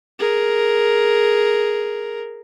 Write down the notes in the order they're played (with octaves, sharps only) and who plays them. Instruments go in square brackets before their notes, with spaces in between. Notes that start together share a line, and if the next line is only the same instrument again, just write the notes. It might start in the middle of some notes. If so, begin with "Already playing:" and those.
[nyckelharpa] G#4 A#4